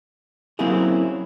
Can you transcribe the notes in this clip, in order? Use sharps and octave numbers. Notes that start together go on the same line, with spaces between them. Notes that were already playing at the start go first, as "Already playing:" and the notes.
F#3 A#3 C4 C#4 E4 G#4